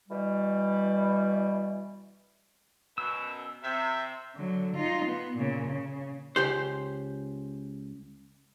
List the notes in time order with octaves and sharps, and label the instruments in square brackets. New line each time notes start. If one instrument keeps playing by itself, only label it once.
[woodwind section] B2 E3 G3
[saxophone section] F#2 B2 [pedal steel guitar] E6
[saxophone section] C3 [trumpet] E5
[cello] D3 F#3
D#4 F4
B3
A#2 C#3
C#3
[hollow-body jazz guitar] C#2 G4 C5